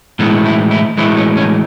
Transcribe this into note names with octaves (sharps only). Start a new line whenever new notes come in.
A2 E3 G#3 B3
E4
E4
A2 E3 G#3 E4
C#4
C#4